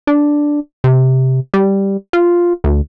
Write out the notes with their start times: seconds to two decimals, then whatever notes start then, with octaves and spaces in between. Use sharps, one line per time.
0.07 D4
0.84 C3
1.54 G3
2.13 F4
2.64 D2